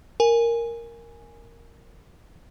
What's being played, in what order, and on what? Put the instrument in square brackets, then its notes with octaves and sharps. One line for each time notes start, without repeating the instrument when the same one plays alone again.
[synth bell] A#4 G#5